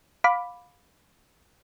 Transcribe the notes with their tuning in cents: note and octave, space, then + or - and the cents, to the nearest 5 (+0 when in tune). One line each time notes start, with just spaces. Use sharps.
F5 +25 B5 +0 D6 +0